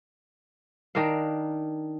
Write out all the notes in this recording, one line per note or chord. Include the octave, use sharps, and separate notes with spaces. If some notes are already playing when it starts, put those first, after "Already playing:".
D#3 D4 A#4 F5